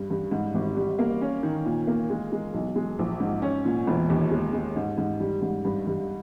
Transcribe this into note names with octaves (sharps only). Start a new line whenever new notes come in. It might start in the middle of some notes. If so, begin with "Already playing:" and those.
Already playing: G2
G2
G#2
G#1
G3
A#3
C#4
D#3
A#2
A#3
G#3
G#3
B1
G#3
A#1
G#2
C#4
A#2
E1
D#2
G#3
G#3
G#2
G#2
G3
G#2
G2
G2